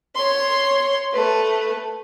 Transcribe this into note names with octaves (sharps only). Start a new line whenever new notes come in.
C#5 C6
A3 B4